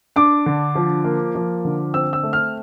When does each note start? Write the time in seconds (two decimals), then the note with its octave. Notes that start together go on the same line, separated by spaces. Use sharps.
0.16 D4 D6
0.46 D3
0.75 F3
1.04 A#3
1.35 F3
1.65 D3
1.94 C4 E6
2.13 E6
2.23 A3
2.33 F6